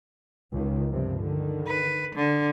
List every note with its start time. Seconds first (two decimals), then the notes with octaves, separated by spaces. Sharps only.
0.53 C#2 D#3
0.91 G2 C3 F3
1.20 D3 D#3
1.67 B4
2.16 D3